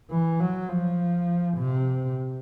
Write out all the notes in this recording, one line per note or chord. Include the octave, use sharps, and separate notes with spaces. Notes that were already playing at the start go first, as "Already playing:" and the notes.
E3
F#3
F3
C3